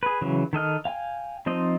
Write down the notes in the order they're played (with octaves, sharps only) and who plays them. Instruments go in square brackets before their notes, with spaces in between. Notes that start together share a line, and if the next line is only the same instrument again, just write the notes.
[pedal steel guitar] G#4 B4
C#3 E3 F#3
D#3 A4 D#5 F6
F5 G5 G#5
F3 C4 D#4 D#5